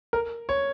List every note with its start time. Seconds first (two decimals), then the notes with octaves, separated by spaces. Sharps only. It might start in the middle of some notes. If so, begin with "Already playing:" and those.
0.13 A#4
0.49 C#5